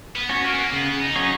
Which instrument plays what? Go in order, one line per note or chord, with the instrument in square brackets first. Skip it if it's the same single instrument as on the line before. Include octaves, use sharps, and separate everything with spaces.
[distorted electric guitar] B3
[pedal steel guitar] C#4 F#4 C#5
[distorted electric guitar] A#3
B3
A#3
[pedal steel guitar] C#3 [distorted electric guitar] B3
[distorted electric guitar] D#4
[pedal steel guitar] F#3 C#4 G#4 C#5